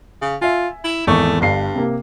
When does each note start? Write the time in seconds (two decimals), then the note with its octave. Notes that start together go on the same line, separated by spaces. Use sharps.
0.22 C#3
0.42 F4 E5 G#5
0.84 E4
1.07 G#1 E2 A3 C#6
1.41 G1 G2 C7
1.75 C3 A#3